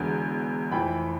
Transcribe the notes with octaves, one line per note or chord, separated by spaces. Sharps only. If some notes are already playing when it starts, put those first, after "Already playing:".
Already playing: E1 E2 D3
F1 F2 E3 G5 B5